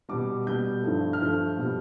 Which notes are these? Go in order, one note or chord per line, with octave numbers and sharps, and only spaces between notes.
B2 G3 D6
B2 G3 G6
G2 F3 A3
F6
G2 F3 A3 G6
B2 G3